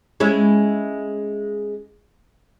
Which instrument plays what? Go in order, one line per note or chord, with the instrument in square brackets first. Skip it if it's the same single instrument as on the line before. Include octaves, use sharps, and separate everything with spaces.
[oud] G#3 C#4 E4